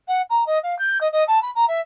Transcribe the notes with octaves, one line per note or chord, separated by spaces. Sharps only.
F#5
A#5
D#5
F5
G6
D#5
D#5
A5
B5
A#5
E5